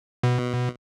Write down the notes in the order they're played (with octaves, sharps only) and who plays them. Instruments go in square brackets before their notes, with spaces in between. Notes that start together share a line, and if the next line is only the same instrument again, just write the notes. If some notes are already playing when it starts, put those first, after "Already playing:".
[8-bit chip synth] B2